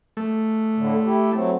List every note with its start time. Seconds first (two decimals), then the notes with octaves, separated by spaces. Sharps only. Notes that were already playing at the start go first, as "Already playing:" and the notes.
0.17 A3
0.75 A2 D3
1.05 E4 G4
1.32 F#3 A3 C4